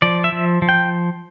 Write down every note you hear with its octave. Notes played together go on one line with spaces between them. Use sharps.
F3 D5
E5
F3
F3
G5